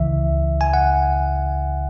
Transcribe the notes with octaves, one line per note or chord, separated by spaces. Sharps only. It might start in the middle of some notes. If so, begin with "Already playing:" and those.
Already playing: C#2 C#3 E3 E5
G#5
F#5